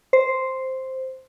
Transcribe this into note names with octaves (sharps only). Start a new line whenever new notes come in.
C5